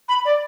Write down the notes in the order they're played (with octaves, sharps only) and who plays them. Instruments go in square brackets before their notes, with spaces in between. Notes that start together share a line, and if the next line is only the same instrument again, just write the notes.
[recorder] B5
D5